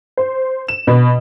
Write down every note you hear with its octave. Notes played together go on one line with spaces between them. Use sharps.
C5
E7
B2